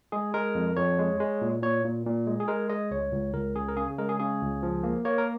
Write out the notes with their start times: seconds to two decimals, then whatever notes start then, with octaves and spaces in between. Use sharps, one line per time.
0.12 G#3 G#4
0.34 G#3 A#4
0.55 F2
0.77 F2 C#5
0.99 G#3
1.20 G#3
1.42 A#2
1.62 A#2 C#5
1.84 A#2
2.06 A#2
2.27 G#3
2.40 G#4
2.48 G#3 A#4
2.70 G#3 D#5
2.91 C#2 C#5
3.12 C#2
3.34 C#2 A#4
3.55 C#3 G#4
3.68 A#4
3.77 C#3 G#4
3.98 G#3 A#4
4.09 G#4
4.20 C#3 G#4
4.41 C#2
4.63 F3
4.83 A#3
5.05 A#3 C#5
5.18 A#4